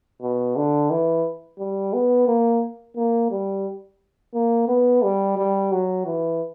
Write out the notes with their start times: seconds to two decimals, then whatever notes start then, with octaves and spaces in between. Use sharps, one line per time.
0.22 B2
0.56 D3
0.90 E3
1.59 G3
1.93 B3
2.27 A#3
2.96 A#3
3.31 G3
4.34 A#3
4.68 B3
5.03 G3
5.38 G3
5.72 F#3
6.06 E3